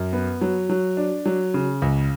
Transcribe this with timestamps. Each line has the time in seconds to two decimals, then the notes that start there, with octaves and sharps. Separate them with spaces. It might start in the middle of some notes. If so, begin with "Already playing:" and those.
Already playing: F#2
0.13 B3
0.41 F#3
0.70 F#3
0.97 D4
1.26 F#3
1.54 C#3
1.82 C#2